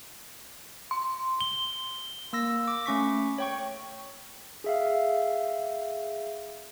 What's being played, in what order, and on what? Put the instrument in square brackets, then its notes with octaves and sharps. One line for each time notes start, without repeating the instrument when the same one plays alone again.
[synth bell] C6
[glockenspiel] G7
[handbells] A#3 E6 A#6
D6
A3 C#4 C#6 B6
C#5 G5 C#6
G#4 E5 F5